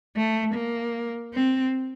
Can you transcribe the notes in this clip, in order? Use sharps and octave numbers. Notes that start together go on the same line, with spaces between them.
A3
A#3
C4